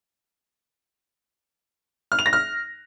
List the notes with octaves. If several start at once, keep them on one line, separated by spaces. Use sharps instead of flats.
F6
F7
A#6
F6